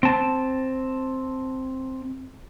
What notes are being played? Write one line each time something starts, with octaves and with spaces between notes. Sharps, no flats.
C4 A5